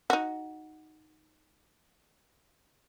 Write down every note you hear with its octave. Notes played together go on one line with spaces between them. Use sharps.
D#4 F#4